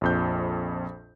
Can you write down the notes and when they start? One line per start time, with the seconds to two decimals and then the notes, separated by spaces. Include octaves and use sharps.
0.01 A#1 F2 G6